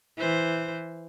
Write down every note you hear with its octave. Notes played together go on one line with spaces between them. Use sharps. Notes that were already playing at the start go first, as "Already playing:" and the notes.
E3 C5